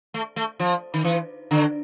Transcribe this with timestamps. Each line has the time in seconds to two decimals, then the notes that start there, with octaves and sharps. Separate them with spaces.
0.14 A3
0.36 A3
0.60 F3
0.94 D#3
1.04 E3
1.51 D3